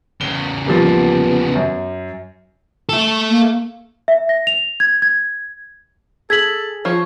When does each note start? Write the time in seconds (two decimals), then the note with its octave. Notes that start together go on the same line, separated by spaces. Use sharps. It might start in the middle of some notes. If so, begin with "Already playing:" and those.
0.21 E2 C#3 G7
0.67 F3 G3 A#3 B3
1.55 F#2
2.89 A4 E5
3.29 A#3
4.08 E5
4.29 A#6
4.47 F7
4.80 G#6
5.02 G#6
6.30 G#4 A4 G#6 B6 F#7
6.85 F3 C#5